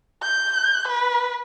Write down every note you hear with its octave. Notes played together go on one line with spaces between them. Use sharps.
G6
B4